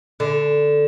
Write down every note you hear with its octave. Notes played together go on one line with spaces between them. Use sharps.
D3